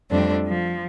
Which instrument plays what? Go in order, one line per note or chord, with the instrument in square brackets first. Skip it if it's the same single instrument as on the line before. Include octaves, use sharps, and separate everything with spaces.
[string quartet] F2 G3 A3 C4 D4
F3